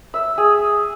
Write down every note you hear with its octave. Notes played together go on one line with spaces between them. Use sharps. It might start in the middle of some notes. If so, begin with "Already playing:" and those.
E5
G#4